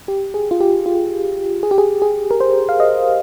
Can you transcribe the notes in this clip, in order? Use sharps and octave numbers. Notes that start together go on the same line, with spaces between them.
G4
G#4
F4
G4
F4
G#4
G4
G#4
G#4
A#4
C5
F5
D#5